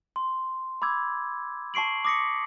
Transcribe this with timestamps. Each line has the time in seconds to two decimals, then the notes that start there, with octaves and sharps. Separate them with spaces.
0.16 C6
0.82 B5 D6 E6 G#6
1.74 A5 C#6 C7 D7 F#7
2.05 D6 D#6 A#6 B6 C#7